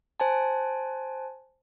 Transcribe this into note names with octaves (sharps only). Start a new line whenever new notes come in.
C5 G#5 A5